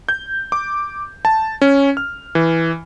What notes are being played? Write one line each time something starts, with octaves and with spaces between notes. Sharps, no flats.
G6
D6
A5
C#4
F6
E3